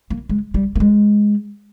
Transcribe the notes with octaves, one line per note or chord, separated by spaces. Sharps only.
A#3
G#3
G3
A#3
G#3